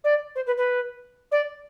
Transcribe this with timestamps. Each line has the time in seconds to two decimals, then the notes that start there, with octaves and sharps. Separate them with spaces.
0.04 D5
0.35 C5
0.46 B4
0.57 B4
1.31 D5